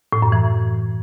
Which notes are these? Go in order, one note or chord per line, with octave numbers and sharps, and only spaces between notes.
A2
F#2
E3